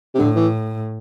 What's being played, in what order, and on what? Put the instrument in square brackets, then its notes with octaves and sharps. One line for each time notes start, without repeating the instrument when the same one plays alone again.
[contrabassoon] C3
[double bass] A2 [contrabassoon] D3
[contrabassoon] E3